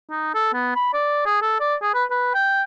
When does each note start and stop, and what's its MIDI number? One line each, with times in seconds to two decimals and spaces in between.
0.10 0.30 63
0.34 0.53 69
0.53 0.74 59
0.75 0.91 83
0.94 1.22 74
1.26 1.40 68
1.42 1.60 69
1.60 1.75 74
1.82 1.90 68
1.94 2.04 71
2.11 2.32 71
2.34 2.63 79